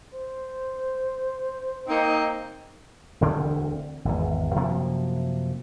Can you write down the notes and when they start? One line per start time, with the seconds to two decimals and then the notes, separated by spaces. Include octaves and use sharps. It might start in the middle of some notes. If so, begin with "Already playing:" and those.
0.14 C5
1.88 A#3 C4 D#4
3.21 E1 D2 D3 C4
4.05 G#1 E2
4.56 F#2 C3 F3 A#3